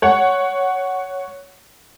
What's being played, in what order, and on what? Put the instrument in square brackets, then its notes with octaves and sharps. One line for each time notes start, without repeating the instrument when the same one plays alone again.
[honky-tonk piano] C#5 F#5 C#6